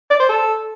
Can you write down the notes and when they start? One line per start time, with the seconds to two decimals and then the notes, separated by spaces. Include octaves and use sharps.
0.10 D5
0.20 C5
0.29 A4